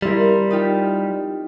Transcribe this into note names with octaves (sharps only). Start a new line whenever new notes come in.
G3 C4 E4 A#4
D#4 F4 G4